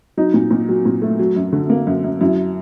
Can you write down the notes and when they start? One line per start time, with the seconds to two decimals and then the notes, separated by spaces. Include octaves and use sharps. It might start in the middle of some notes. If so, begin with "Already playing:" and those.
0.17 F#3 D#4
0.34 A#2
0.51 A#2
0.69 F#3
0.85 A#2
1.02 A3
1.19 F#3
1.36 F#2
1.53 D3
1.70 A#3
1.87 F#2
2.04 F#2
2.21 F#2 E4